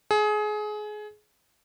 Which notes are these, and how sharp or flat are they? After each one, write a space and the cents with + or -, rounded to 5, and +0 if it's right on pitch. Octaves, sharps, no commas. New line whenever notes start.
G#4 +25